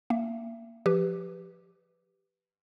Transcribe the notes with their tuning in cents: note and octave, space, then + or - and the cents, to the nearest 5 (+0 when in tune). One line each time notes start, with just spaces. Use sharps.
A#3 +0 E5 +30
F3 +0 G4 +0 B4 +0